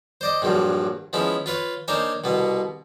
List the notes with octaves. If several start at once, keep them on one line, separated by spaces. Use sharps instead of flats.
C5 D5 D#5
A#1 G2 F3 F#3
F3 G#3 B3 C#4 E4
F4 B4 C#5
A#3 D4 D#4 C5 C#5 G#5
C2 B2 B3